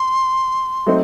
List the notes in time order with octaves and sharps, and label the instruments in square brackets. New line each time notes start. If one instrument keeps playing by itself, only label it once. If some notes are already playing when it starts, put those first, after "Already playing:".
Already playing: [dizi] C6
[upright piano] F#3 A3 C4 D#4